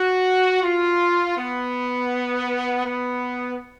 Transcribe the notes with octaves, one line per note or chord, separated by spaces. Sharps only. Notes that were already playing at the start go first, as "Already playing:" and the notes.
Already playing: F#4
F4
B3
B3